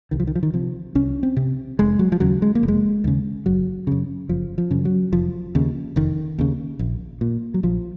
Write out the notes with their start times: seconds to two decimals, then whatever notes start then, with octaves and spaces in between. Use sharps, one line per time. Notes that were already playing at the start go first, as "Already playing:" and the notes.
0.11 C2 D#3
0.20 F3
0.27 D#3
0.35 F3
0.43 D#3
0.54 C3 F3
0.95 C2 C#4
1.23 C4
1.37 C3
1.79 F1 G#3
1.99 F#3
2.12 F3
2.20 D#2 C#3 F#3
2.42 G#3
2.55 A#3
2.63 F1
2.68 G#3
3.04 D#2 C#3
3.46 F#1 F#3
3.87 F#2 C#3
4.29 F#1 F3
4.58 F3
4.71 F#2 C#3
4.85 F#3
5.13 F1 F3
5.55 D#2 C#3
5.96 F1 D#3
6.39 D#2 C#3
6.79 A#1
7.21 A#2
7.54 F#3
7.63 A#1 F3